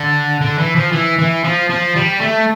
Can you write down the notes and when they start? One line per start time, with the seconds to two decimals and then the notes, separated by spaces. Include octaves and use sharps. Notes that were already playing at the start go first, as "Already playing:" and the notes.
Already playing: D3
0.41 D3
0.59 E3
0.76 F3
0.92 E3
1.19 E3
1.44 F3
1.70 F3
1.96 G3
2.21 A3